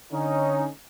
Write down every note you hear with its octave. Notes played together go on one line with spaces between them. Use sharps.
D3 C#4 D#4